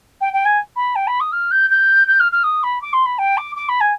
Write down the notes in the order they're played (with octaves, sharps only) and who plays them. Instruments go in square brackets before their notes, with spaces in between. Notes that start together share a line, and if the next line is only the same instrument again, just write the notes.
[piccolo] G5
G5
G#5
B5
G5
B5
D#6
F6
G6
G6
G6
F6
F6
D#6
B5
D6
C6
B5
G5
D6
D6
B5
G#5